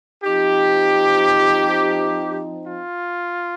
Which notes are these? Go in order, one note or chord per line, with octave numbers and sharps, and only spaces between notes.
F3 C4 D#4 G4
F4